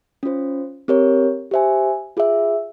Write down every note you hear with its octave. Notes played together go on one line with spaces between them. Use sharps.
C#4 F4 C5
C4 G4 A#4 C#5
G4 C5 E5 G#5
F4 G#4 E5